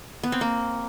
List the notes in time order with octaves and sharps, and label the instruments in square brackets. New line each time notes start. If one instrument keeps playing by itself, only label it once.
[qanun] B3
C4
A#3